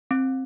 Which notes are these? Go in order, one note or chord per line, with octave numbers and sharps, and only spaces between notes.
C4